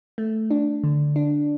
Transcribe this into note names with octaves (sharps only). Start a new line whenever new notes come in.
A3
D4
D3
D4